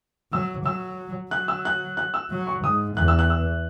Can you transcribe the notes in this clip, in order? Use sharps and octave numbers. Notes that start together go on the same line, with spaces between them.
F#3 E6
F#3 E6
F#3 F#6
E6
F#6
F#6
E6
F#3
C#6
G#2 D#6
E2 F#6
E6
F#6
E6